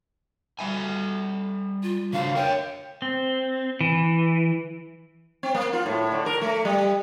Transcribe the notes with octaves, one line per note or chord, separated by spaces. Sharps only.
G3 E5 G#5
F4
C#3 D4 F#4 F5
A#4 C#5 G5
C4
E3
C4
A#3
F4
A2
D3
A#4
A3
G3